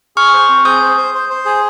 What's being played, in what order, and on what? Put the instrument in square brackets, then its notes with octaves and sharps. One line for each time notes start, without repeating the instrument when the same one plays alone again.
[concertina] G#4 [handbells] C#6 F6
[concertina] C5
C4
[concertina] G#4 [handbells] D#6 G6
[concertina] C5
C5
C5
C5
G#4